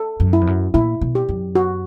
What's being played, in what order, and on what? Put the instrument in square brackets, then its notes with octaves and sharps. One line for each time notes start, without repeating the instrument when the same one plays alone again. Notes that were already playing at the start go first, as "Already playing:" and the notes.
Already playing: [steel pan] A4
[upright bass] F#2
[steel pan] E4
[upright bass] F2
F#2
[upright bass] A#2 [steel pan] E4
[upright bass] B2
[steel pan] G4
[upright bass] F#2
[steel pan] F#4